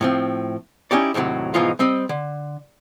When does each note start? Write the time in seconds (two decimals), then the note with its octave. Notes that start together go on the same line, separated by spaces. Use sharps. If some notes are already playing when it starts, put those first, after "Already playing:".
0.01 A2 F3 C4
0.91 C#4 D#4 E4 G4 C#5 D5
1.14 D#2 A2 C3 E3 F#3
1.54 G#2 B2 E3 F3 D#4 F4
1.79 G3 C4 D#5
2.09 D3